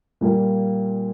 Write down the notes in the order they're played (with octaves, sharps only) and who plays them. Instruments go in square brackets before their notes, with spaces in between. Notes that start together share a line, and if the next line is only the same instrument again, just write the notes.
[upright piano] A#2 G3 A#3 F4